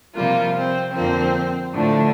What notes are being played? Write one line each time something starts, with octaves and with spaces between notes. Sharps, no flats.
C3 F3 G3 A#3 F4
C4
F2 D3 F3 A#3 C4
A2 D3 F3 A3 D4